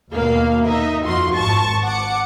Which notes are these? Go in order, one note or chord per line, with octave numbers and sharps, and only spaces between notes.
D#2 B2 A#3 F5
D#4 D#5 E5
F2 F4 F#4 C6
G#1 A5 C#6 A6
F#5 D6 C#7